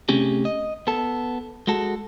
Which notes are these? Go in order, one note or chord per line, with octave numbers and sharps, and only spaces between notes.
C3 A3 C#4 G4 G#4
D#5
B3 A4
G#3 F#4 A4